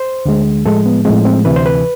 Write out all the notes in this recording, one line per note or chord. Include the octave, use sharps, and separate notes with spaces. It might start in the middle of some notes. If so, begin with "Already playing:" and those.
Already playing: C5
D2 D3 G#3
A2 F3 G#3 A4
B3
A2 F3 G#3 C4
C4
D2 C3 E3 B4
C5
B4